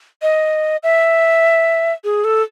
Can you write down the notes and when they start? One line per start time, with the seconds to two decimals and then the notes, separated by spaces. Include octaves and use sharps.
0.22 D#5
0.83 E5
2.04 G#4
2.24 A4